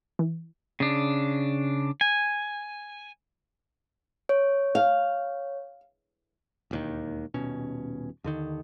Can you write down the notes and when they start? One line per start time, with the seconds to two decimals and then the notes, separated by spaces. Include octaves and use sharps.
0.19 E3
0.80 C#3 D4
2.01 G#5
4.29 C#5
4.75 F5
6.71 E1 D#2 D#3
7.34 D#1 B2 C#4
8.24 D#2 D3 D#3